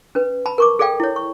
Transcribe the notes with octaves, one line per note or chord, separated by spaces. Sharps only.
C#4 B4
A5 B5
A#4 C#6 D6
G#4 A4 D5 F5 G5
E4 C#5
C#6